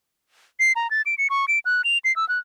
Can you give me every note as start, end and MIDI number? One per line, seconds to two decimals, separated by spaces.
0.60 0.72 96
0.76 0.90 82
0.91 1.02 93
1.06 1.15 98
1.18 1.28 97
1.30 1.45 85
1.48 1.59 98
1.65 1.82 90
1.84 1.98 101
2.05 2.14 96
2.16 2.28 88
2.29 2.39 90